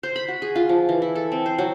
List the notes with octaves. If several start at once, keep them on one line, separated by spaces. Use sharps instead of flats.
C5
B5
F#4
G#4
F4
F3
E3
E4
A4
C4
C5
F#3